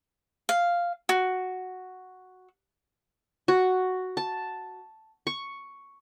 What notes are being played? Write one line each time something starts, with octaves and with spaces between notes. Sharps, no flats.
F5
F#4
F#4
A5
C#6